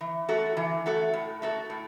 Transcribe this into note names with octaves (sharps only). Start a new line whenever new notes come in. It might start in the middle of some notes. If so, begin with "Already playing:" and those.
E3
A3 F#4 A4
E3
A3 F#4 A4
A2
A3 F#4 A4
A2